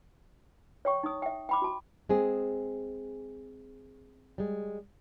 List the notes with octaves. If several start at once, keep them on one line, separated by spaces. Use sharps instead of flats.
C#5 G5 C#6
D#4 D#6
E5 G5
G5 B5 D6
F#4 A5
G#3 C4 G#4
G3 G#3